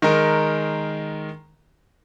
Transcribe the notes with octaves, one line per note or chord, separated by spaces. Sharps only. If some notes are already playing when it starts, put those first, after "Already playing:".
D#3 G#3 A#4